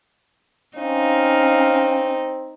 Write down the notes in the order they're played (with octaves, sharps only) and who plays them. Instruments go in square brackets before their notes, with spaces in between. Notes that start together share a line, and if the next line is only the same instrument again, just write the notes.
[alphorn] C4 [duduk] C#4 [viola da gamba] D#4 [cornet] F5